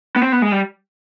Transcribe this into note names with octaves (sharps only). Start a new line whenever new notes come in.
B3
C4
B3
G#3
G3